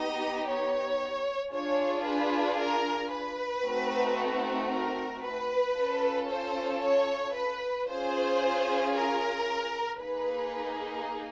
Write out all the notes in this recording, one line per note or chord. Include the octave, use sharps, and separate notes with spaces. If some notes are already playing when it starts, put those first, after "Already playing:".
Already playing: B3 D#4 G4 D#5
C#5
D4 F4 G#4 C#5
B4
A#4
B4
A3 C4 D#4 F#4
A#4
B4
C#4 F4 A4
C5
C#5
B4
C#4 F4 G#4 C5
A#4
A#3 D#4 G#4 B4